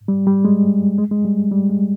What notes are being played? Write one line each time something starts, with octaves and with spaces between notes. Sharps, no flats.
G3
G3
G#3
G#3
G#3
G3
G3
G#3